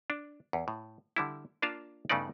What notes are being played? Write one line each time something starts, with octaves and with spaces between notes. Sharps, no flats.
D4
E2
A2
D3 G3 E4
A#3 D4 F4 F5 A5
G2 C#3 A3 B3 D#4 D5